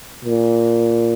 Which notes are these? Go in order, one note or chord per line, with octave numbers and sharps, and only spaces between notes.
A#2